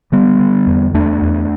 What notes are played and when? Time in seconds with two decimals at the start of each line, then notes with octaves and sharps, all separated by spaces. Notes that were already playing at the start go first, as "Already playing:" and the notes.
0.12 D3 G3 B3
0.39 D3
0.67 E2
0.94 E2 A3 D4
1.22 E2